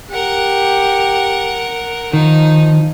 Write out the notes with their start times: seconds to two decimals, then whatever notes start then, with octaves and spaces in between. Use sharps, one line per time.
0.11 G4 A#4 F#5
2.13 D#3 F3 D#4